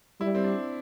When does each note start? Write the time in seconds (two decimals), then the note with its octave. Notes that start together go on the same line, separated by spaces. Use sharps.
0.20 G3 E4
0.35 C4
0.44 D4